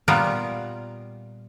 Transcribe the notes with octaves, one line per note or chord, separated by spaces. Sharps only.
A#2 G3 B3 F4 A#4